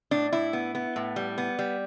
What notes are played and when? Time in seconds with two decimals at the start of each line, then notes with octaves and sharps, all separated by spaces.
0.11 A2 D4
0.33 A2 E4
0.53 B3
0.75 B3
0.96 A2
1.16 G3
1.38 B3
1.59 G3